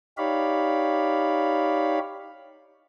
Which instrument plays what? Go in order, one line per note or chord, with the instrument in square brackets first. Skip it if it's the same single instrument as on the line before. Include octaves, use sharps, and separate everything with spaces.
[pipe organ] D#4 G4 C#5 D5 F5 B5